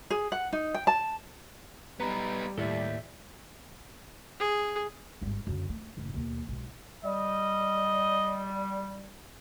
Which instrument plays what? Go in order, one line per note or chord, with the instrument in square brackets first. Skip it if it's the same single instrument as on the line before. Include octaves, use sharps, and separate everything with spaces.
[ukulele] G#4
F#5
D#4
G5
A5
[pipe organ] G3 [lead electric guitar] B3 D#4 [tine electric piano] B4 A#5 B5
[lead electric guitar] D#2 [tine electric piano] A2 [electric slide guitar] A4 D5 E5
[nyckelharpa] G#4
[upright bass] G#1 G2
F#2 D3
A3
F#1 A2
D#2 B2
B1 G#2
[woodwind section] G3 [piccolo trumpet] D#5